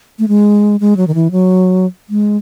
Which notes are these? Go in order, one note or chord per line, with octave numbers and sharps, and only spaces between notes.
A3
G#3
G#3
F#3
D#3
E3
F#3
G#3